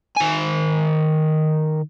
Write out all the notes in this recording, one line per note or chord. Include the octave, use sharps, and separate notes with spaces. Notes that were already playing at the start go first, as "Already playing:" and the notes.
D#3 G#5